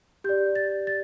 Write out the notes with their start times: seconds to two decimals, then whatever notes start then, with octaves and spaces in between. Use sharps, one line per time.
0.24 G4 D5 G6
0.56 A6
0.87 A6